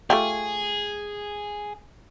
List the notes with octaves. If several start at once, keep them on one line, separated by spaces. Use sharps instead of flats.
A3 F4 G4 G#4